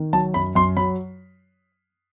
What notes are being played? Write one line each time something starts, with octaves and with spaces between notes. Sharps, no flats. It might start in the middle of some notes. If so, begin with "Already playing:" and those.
Already playing: D#3
F#3 A5
F#2 B5
F#2 C6
F#3 B5